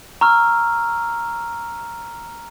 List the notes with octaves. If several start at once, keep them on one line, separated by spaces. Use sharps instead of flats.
A#5 C#6 E6 F6